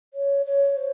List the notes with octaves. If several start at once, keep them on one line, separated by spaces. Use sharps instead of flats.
C#5
C#5
C5